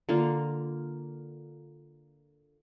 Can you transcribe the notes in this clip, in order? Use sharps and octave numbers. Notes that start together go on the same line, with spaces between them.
D3 A#3 F4